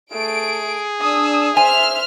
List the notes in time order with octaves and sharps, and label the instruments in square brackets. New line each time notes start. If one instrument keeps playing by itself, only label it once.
[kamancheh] A3 [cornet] G#4 [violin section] D7
[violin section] D4 [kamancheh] D#6 E6
[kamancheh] C5 [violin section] E5 F6 [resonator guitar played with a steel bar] G#5